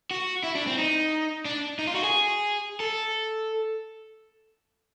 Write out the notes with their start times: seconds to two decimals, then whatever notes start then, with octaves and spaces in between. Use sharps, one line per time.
0.11 F#4
0.44 E4
0.55 D4
0.67 C4
0.78 D#4
1.45 D4
1.79 D#4
1.87 F4
1.95 F#4
2.04 G#4
2.80 A4